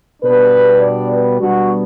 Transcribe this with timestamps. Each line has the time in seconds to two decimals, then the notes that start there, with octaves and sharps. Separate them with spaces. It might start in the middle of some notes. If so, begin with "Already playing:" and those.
0.22 B2 G3 B3 D4 B4
0.81 D5
1.10 B4
1.39 B2 G3 B3 D4 F#4